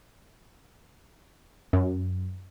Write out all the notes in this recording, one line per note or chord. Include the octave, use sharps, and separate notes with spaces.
F#2